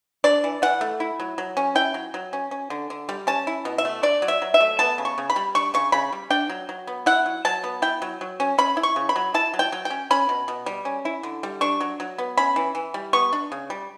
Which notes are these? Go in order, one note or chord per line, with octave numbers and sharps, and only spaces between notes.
D4 D5
E3
E3 F#5
A3
E4
F#3
F#3
C#4
E4 G5
F#3
F#3
C#4
C#4
D3
D3
G3
C#4 A5
E4
B2
E5
A3
D4 D5
F#3
E5
F#3
E5
A3
B3 A5
C#3
C#6
C#3
B5
G3
D4 C#6
C#3 C#6
C#3 B5
G3
D4 G5
F#3
F#3
B3
E4 F#5
F#3
F#3 A5
B3
E4 G5
F#3
F#3
C#4
C#4 B5
E4
C#6
C#3
B5
F#3
E4 A5
F#3
G5
F#3
G5
C#4
C#4 B5
B2
B2
G3
C#4
E4
D3
G3
D4 C#6
F#3
F#3
B3
C#4 B5
E3
E3
G3
B3 C#6
D4
C#3
G3